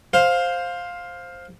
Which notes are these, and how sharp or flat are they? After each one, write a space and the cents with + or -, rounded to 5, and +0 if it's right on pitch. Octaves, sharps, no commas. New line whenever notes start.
C5 +5 F5 +10